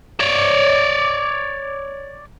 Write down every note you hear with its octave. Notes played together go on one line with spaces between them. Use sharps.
C#5 D5